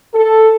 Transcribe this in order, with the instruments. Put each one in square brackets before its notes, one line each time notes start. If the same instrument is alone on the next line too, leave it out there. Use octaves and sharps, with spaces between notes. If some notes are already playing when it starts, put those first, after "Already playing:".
[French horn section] A4